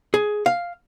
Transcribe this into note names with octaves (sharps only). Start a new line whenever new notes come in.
G#4
F5